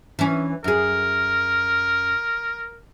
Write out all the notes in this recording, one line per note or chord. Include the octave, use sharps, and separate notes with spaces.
E3 C#4
F#2 G#4 A#4